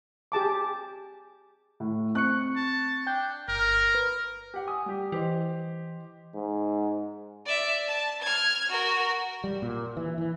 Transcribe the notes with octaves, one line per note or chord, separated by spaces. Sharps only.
G4 G#4 A5 D6
A2
C4 C#6 F#6 C#7
A5
D4 G5 G6
G1 A#4
B4
G4 F#5
G#5 D#6
G3 G4
E3 G4 C5 D#5
G#2
D5 E5
A5
F6 G#6
F#4 A#4
G3
A#2
E3
E3